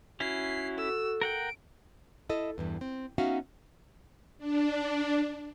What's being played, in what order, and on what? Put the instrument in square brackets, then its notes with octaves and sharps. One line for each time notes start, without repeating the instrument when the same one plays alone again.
[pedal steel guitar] C#4 E4 [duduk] F#4 [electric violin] C7
[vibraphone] A4 [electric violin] E6
[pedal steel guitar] A#4 F#5 G5 [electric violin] D7
[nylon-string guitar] E4 A4 D#5
E2 G2 E3
C4
B3 C#4 D#4 F#4 E5 F5
[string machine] D4